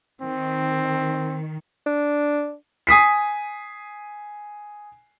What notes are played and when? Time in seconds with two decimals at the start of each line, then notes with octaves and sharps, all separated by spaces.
0.21 D#3 C4
1.87 D4
2.87 G#5 D#6 B6 C7